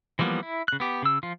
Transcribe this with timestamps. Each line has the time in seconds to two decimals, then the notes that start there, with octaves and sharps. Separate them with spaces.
0.19 E3 F3 G3 A#3 B3
0.43 E4
0.68 C#3 F#6
0.80 B3 G4
1.02 C#3 E6
1.23 F3 F4